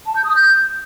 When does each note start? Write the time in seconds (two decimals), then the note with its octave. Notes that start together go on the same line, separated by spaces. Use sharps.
0.06 A5
0.15 G6
0.25 D#6
0.34 G6